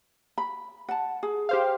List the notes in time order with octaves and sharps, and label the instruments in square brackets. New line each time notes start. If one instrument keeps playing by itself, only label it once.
[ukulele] B5
F#5 A5
G#4
[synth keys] G4 C5 F5